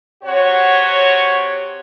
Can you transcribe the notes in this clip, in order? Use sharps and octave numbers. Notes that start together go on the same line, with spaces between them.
C3 F#4 C#5